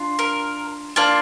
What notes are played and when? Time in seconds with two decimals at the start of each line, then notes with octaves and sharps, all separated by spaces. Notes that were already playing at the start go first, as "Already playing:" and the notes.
Already playing: D4 F4
0.19 A#4
0.96 A#3 D4 F4